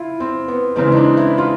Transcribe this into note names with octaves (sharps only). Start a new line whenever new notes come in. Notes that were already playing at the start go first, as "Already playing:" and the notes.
Already playing: E4 F4
C4
B3
C#3 E3 G#3 C4
D#4
D4
E4
F4